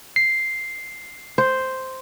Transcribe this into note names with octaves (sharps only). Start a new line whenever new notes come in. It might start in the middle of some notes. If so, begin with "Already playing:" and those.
C7
C5